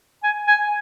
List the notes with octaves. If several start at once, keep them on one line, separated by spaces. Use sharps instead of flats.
G#5
G#5